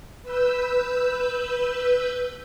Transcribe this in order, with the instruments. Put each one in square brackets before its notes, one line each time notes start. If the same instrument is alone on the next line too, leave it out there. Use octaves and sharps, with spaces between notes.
[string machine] B4 E6 G6